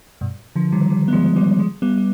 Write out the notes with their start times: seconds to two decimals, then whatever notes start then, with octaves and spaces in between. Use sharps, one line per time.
0.21 G2 B2
0.56 D3 F3
0.72 D#3 G3
0.90 D#3 G3
1.08 B3
1.13 F3 G#3
1.36 G3 B3
1.59 F3 G#3
1.82 G3 B3
1.97 G3